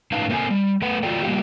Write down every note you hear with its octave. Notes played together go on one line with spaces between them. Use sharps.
A2 C#4 D#4 B4 F5 A5
A#3 C4 F#4 A4 G#5
G3
A3 B4 F#5
F4 F#4 A4 D5 G5
G3 A#3 F#4 G4